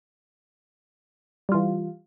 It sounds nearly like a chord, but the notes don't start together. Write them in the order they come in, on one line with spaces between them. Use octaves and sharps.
G3 F4 E3